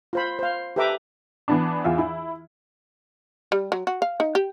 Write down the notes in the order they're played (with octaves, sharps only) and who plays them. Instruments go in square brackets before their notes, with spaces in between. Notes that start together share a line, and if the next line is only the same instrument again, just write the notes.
[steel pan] F4 C5 B5
C5 F5
G4 A4 B4 E5 A#5 D6
[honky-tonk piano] E3 B3 D4
E2 F4 E5
E4
[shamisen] G3
F#3
F#4
F5
D#4
G4